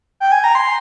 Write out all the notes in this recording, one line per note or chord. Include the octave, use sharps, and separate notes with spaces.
G5
G#5
A#5
C6